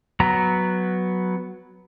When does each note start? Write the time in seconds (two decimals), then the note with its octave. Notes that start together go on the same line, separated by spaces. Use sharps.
0.20 F#3 B3 A#5